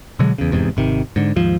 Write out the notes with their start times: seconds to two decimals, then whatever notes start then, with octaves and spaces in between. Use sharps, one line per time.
0.19 B2 D3 F#3 G#3
0.38 E2 C#3
0.51 F1 E2 G#2 C3
0.77 G#1 C3 D#3
1.16 G#2 D3
1.36 D#2 G#2 F3